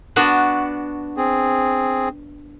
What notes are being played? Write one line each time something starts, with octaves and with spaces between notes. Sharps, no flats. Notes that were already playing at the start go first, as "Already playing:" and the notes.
B3 D4 F#4
C4 G#4